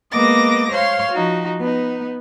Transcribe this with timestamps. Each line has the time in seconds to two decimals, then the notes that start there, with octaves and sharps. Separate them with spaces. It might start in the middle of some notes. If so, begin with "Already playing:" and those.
0.11 G#3 A#3 B3 D#5 D6 A#6
0.71 C5 C#5 F5 C6
1.12 F3 D#4 F#4
1.60 B3 D#4